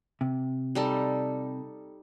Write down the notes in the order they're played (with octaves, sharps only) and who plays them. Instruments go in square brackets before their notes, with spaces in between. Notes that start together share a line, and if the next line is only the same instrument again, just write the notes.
[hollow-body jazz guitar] C3
[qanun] G3 D#4 A4